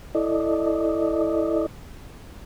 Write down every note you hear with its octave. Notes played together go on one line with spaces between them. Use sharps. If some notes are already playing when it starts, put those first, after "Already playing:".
E4 A4 D5 D#5